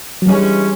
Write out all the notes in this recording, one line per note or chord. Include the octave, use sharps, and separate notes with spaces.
F#3
G2 E3 G3 G#3 C#4